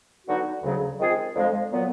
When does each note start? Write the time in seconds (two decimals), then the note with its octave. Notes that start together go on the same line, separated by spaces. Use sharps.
0.27 D3 F#3 B3 D#4 F#4
0.62 D2 C#3 F#3
0.99 D#3 G#3 C4 F4 G#4
1.36 F2 D3 F3 G#3
1.72 A#2 F#3 B3